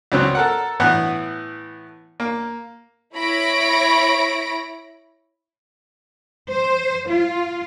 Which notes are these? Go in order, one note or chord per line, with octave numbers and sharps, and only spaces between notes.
C#2 C#3 F#3 B3 C4
A4 A#4 F#5
A2 E3 B3 F#5
A#3
E4 C#5 B5 A#6 D7
C5
F4